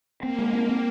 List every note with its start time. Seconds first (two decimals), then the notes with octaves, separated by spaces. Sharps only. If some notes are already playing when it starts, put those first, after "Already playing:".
0.23 A#3 C4
0.39 G#3
0.53 C4
0.69 C4